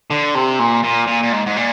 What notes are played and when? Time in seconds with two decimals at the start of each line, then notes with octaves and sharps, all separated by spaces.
0.10 D3
0.35 C3
0.59 A#2
0.84 A#2
1.07 A#2
1.23 A#2
1.33 G#2
1.47 G#2
1.57 A#2